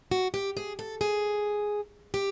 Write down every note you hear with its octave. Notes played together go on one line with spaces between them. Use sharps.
F#4
G4
G#4
A4
G#4
G4